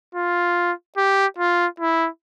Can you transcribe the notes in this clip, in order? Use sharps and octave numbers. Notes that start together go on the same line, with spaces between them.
F4
G4
F4
E4